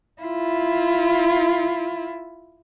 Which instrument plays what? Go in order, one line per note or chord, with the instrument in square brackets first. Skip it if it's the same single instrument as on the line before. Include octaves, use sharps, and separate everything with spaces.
[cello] E4 F4